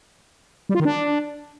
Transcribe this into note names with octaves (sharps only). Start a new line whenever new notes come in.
G3
F4
D#3
D4